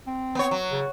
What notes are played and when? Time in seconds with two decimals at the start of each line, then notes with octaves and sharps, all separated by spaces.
0.07 C4
0.35 B3 C#5
0.51 F#3
0.71 C#3